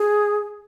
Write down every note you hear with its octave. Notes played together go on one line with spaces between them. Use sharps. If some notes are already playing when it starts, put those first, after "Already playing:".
Already playing: G#4